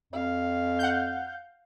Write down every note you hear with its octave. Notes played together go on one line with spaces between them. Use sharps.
F2 F5
F#5 G6